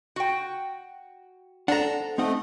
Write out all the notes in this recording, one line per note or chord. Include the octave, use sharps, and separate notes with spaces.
F#4 G5
D4 A4 C5 F#5 A#5
A3 C4 D#4 D#5 F#5